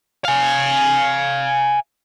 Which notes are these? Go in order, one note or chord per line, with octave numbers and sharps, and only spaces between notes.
F5 G#5